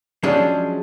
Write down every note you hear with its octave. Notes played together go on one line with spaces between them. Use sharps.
F3 F#3 G#3 C#4 D4 G#4